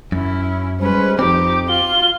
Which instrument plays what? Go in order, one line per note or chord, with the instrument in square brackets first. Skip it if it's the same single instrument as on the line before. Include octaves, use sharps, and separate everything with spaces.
[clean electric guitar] F#2 [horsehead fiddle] C#4 E4
[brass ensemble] G3 G#3 C5 [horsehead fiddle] C#4 B4
[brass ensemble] F2 [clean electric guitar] C4 [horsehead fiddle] D#4 G4 [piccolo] D6
[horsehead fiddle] F4 [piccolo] G7